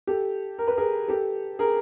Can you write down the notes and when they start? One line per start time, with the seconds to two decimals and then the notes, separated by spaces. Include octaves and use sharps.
0.07 G4 A4
0.59 A#4
0.68 B4
0.77 G#4 A#4
1.08 G4 A4
1.59 G#4 A#4